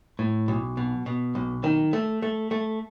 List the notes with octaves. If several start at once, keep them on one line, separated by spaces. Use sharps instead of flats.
A2
B1
B2
B2
B1
D#3
A3
A3
A3